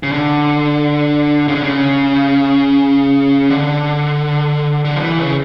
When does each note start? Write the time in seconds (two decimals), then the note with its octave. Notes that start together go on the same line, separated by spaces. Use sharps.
0.03 C#3
0.12 D3
1.48 C#3
1.55 D3
1.64 C#3
3.50 D3
4.85 D3
4.95 F3
5.02 E3
5.19 C#3